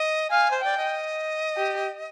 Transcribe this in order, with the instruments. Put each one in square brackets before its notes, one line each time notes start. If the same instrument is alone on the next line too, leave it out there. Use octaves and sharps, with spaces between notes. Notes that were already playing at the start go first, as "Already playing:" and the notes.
Already playing: [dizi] D#5
[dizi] F5 [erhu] G#5
[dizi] C5
[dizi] D5 [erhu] G5
[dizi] D#5
[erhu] G4